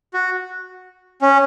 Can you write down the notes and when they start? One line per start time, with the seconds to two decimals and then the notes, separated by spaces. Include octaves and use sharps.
0.14 F#4
1.22 C#4